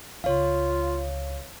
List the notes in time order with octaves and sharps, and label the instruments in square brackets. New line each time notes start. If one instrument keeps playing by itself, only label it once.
[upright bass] C#2 [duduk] F4 [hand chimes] C#5 F5